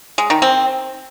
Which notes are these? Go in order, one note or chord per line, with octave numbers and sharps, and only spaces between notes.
G#3
D#3
C4